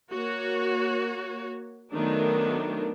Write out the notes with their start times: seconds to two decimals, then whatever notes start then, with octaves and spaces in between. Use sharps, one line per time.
0.11 A#3 F#4 C#5
1.93 D#3 F#3 A3 B3 D4